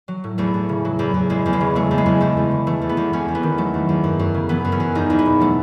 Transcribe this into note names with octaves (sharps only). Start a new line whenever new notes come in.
F#3
A2
E2 A3
E2
C#3
F#3
E2
E2
E2 G#3
E2
G#3
C#3
F#3 A3
E2
G#3
E2
E2 A3
E2
C#3
E3 A3
E2
B3
E2
E2 C#4
E2
B3
D#3
F#3 A3
E2
E2
F#2
F#2
C#3
E3 B3
F#2
C#4
F#2
E2 D#4
E2
B3
B2
F#3 A3